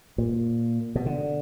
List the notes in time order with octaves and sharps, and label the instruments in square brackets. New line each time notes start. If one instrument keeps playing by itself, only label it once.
[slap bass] A#2
B2
D3